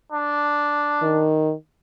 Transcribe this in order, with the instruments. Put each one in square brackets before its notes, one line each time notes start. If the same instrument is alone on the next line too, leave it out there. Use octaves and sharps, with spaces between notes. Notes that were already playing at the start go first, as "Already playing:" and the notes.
[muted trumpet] D4
[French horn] D#3